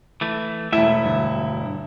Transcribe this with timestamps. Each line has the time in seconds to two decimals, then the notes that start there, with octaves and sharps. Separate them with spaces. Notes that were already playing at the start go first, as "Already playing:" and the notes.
0.21 E3 A3
0.72 E1 A3 E4 E5
1.05 D2 G2